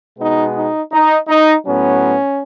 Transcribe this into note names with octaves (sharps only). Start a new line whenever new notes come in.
B2 G#3 B3 D#4
D#4
D#4
D#4
A2 F#3 B3 C#4